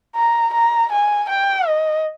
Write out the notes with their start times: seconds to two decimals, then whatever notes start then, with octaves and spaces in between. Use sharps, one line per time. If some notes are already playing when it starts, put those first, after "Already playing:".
0.16 A#5
0.54 A#5
0.92 G#5
1.29 G5
1.67 D#5